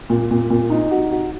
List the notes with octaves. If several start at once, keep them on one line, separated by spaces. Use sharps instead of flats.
A#2
A#2
A#2
D#4
F#4
F#4